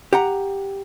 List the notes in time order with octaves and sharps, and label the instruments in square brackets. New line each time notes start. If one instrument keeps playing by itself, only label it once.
[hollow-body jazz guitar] G4 F#5 A#5